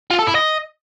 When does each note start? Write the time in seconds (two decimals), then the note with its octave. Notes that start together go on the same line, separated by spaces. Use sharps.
0.11 F4
0.19 A4
0.27 E4
0.35 D#5